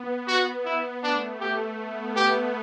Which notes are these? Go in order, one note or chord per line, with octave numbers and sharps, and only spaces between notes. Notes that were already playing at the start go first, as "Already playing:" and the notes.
Already playing: B3
F#4
E4
A3 D4
G4
B3
B3 G4